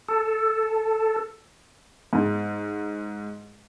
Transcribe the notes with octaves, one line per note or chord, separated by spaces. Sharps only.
A4
G#2